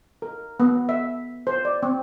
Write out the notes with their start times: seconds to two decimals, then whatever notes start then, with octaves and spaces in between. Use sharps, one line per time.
0.22 A#4
0.60 B3
0.89 E5
1.47 C5
1.65 D5
1.83 C4